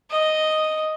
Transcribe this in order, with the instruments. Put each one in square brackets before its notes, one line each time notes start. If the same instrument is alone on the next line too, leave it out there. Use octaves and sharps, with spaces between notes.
[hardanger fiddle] D#5